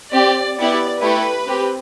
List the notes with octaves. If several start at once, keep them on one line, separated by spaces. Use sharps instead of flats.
C4 G4 D5
B3 E4 G4 D5
A3 E4 G4 B4
C4 G4